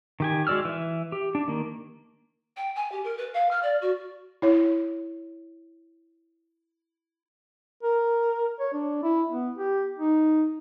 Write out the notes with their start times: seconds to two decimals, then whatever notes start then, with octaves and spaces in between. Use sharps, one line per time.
0.20 D#3 G4 G#5
0.47 G#3 F#4 D5 E6 F6
0.65 E3 E5
1.12 G4
1.35 D4
1.48 D#3 A#3
2.56 G5
2.75 G#5
2.91 G4
3.04 A#4
3.17 B4
3.34 F5
3.51 F6
3.63 D5
3.81 F#4
4.42 E4 C#5
7.83 A#4
8.60 C#5
8.74 D4
9.03 E4
9.31 B3
9.58 G4
9.99 D#4